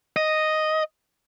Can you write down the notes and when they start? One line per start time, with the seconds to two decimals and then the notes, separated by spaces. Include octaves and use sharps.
0.16 D#5